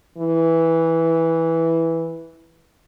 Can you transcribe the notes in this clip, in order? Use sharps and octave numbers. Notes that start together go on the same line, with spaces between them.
E3